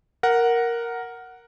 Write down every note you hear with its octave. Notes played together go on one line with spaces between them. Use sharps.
A#4 F#5